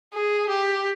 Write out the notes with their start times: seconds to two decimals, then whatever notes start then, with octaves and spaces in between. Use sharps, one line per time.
0.14 G#4
0.49 G4